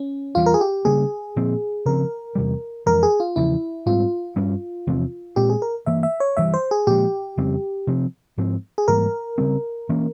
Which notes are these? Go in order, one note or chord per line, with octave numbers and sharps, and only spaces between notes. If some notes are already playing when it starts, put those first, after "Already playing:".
Already playing: C#4
E2 E3 G3 F4
A#4
G#4
G4
C#3 G3 A#3 G#4
A#2 F3 C4
C#3 F3 C4 A#4
E2 C3 G3
F2 E3 G#3 A#4
G#4
F4
E2 C#3 F3 E4
G#2 G3 C4 F4
G2 G3 C#4
E2 C3 F3 C4
A#2 G#3 C4 G4
G#4
A#4
G2 E3 A#3 E5
E5
C#5
G2 E3 G3 E5
C5
G#4
A#2 F3 G#3 G4
F2 C#3 G3 C4
C3 F3 C4
G#2 F3 C4
G#4
G#2 E3 G3 A#3 A#4
C#3 G3 C4
E3 A#3 C#4